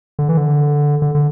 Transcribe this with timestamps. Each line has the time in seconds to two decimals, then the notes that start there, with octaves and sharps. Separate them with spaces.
0.19 D3
0.29 E3
0.37 D3
1.02 D3
1.15 D3